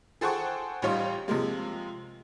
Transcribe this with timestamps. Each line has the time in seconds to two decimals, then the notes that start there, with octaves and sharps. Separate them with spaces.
0.21 G#4 A4 C5 F#5 G5 C#6
0.82 A1 G3 D#4 F4 C#5 C6
1.28 C3 F3 G#3 A#3